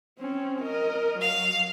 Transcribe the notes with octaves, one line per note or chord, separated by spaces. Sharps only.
C4 C#4
A#4 D#5
F#3 F5